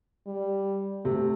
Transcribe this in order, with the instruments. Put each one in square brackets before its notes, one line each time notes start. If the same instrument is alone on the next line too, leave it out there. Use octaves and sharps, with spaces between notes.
[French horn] G3
[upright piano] C3 [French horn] A3